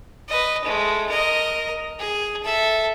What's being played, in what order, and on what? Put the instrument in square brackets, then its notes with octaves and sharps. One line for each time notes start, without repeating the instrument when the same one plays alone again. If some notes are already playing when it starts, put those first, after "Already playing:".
[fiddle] B4 D#5
G#3 A3
A#4 D#5
G#4
A4 E5